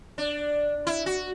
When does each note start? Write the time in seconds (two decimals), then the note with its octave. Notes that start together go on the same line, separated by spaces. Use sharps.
0.18 D4
0.87 E4
1.06 F#4